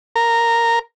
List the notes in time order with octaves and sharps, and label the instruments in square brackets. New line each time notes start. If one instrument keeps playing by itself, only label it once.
[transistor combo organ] A#4